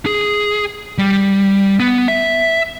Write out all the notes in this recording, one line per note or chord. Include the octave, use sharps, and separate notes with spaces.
G#4
G3
B3
E5